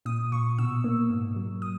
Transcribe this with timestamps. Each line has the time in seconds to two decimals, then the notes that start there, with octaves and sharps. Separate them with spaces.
0.05 A#2 D#6
0.32 A#2 C#6
0.58 B2 E6
0.84 A#3
1.10 G#2
1.36 F#3
1.62 D#6